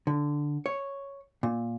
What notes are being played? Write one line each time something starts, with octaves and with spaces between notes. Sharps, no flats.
D3
C#5
A#2